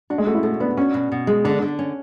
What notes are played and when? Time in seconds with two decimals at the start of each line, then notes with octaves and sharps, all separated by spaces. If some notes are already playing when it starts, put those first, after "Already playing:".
0.10 D4 F#4
0.18 G#3
0.26 A3 F#4
0.35 E4
0.43 B2 A3
0.60 B3 D4
0.77 C#4 F#4
0.94 B2
1.12 B2
1.27 G#3
1.45 D3 D4
1.62 D3
1.79 C#4